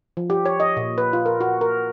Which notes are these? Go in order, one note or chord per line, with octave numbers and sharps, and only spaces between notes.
F3
G4
C#5
D#5
A#2
B4
F4
A#4
F#4
A#4